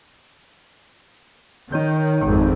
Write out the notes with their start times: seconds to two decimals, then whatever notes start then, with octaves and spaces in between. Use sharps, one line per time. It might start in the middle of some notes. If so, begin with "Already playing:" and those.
1.72 D#3 D#4 C#5 G6
2.23 G#1 F2